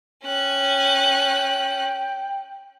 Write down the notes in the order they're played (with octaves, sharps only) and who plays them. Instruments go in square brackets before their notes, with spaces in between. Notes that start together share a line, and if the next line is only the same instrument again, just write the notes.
[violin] C#4 F#6 [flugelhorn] G5